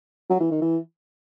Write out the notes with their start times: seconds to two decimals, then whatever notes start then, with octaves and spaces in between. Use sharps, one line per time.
0.30 F#3
0.40 E3
0.51 D#3
0.62 E3